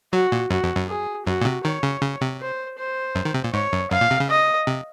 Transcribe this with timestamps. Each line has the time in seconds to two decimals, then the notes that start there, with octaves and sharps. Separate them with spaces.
0.13 F#3 F#4
0.32 A#2
0.50 F#2 F#4
0.64 F2
0.76 F#2
0.89 G#4
1.26 F#2 F#4
1.41 A#2
1.45 C3
1.64 D#3 C#5
1.83 C#3
2.03 C#3
2.21 C3
2.41 C5
2.78 C5
3.15 F#2
3.25 D#3
3.34 C3
3.44 A#2
3.54 G#2 C#5
3.73 F#2
3.91 F#2 F5
4.01 A#2
4.11 C3
4.20 C#3
4.30 D#5
4.67 C3